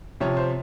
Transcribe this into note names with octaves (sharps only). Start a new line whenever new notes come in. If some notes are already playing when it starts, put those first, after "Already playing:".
C3 F3 C#5
C5